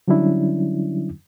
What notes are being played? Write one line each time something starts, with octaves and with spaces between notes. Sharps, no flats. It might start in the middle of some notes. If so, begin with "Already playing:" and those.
D3 F#3 G3 C#4 D4 E4